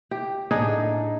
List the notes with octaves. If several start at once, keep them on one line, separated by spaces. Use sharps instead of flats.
G4
A2 D4 D#4 G#4